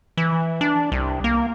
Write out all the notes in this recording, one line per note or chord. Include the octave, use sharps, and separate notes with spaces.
E3
D4
C2
A#3